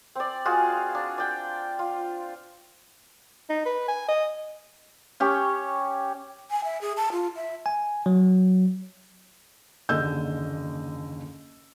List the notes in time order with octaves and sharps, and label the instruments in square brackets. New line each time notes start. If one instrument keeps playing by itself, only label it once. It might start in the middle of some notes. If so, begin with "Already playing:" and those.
[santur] C4 D5
G#3 F4 F#4 G#4
D4
D5 G5
F4
[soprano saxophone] D#4
B4
G#5
D#5
[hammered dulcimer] C#4 G4 C#5
[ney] G#5
E5
G#4
A5
F4
E5
[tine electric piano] G#5
F#3
[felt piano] F#1 D#2 D3 D#5 E6 G6